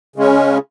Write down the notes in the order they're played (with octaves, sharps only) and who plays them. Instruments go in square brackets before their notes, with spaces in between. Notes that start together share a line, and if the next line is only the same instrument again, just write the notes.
[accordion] C#3 G#3 C#4